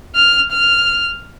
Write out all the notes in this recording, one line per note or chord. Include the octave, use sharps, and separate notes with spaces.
F6
F6